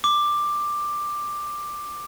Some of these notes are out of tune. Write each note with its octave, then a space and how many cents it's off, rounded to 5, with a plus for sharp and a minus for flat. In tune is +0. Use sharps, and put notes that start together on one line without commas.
D6 +10